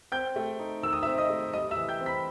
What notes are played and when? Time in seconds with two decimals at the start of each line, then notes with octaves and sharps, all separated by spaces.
0.12 C4 G5 G6
0.36 A3
0.59 D#4
0.83 D#3 E6
0.93 D#6
1.03 E5 E6
1.07 C4
1.18 D#5 D#6
1.30 A3
1.53 G3 D#5 D#6
1.71 E5 E6
1.77 E3
1.89 G5 G6
2.01 C4
2.06 B5 B6